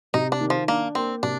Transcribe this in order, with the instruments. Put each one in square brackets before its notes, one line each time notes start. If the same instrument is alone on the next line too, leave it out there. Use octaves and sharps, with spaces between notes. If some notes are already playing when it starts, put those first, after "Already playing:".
[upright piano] C3 [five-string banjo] D#4
[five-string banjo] D4
[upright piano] D#3
[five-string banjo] F3
[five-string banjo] A#3 [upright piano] D4
[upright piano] A#3 [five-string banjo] C4
[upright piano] C3 [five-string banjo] D4